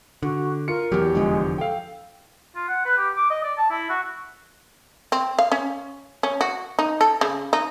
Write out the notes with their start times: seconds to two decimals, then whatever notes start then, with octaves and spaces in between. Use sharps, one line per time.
0.23 D3 F#4
0.68 F4 A#4 C#7
0.92 E2 E3 F#3 G4
1.13 F1 D3 F3 G#3
1.58 A4 F5 G5
2.56 F4
2.68 F#5
2.86 B4
2.97 G4
3.17 D6
3.30 D#5
3.44 D5
3.58 A5
3.71 E4
3.90 F#4
5.12 C4
5.39 F5
5.52 C#4
6.23 C#4
6.41 F#4
6.79 D#4
7.01 A4
7.21 C#3
7.53 D#4